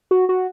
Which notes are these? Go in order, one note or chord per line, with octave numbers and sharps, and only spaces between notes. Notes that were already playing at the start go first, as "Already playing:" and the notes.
F#4
F#4